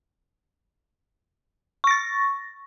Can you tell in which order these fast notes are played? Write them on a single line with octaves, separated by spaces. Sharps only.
C#6 A#6 A6